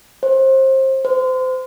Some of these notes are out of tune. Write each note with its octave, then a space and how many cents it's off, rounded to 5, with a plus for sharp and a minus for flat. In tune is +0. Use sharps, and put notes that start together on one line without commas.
C5 +25
C5 -30